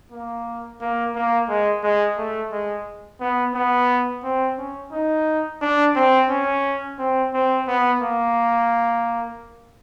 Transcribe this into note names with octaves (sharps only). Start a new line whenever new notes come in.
A#3
A#3
A#3
G#3
G#3
A3
G#3
B3
B3
C4
C#4
D#4
D4
C4
C#4
C4
C4
B3
A#3